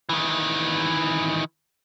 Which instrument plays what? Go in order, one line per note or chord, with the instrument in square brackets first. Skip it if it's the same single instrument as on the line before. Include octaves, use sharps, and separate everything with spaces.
[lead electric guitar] D#3 E3